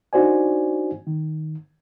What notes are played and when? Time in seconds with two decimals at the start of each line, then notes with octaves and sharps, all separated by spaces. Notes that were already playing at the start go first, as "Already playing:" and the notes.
0.13 D4 D#4 F#4 C5 D5 G#5
1.07 D#3